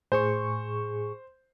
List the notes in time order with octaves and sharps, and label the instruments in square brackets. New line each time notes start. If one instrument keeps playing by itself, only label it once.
[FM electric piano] A2 G#4 C#6 [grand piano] C5